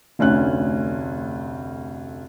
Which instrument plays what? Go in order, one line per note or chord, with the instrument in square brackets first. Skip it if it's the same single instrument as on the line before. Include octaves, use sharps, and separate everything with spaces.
[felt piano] F1 D2 C#4 F#6